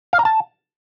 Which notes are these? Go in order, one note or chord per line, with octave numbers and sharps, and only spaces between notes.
F5
A#5
A5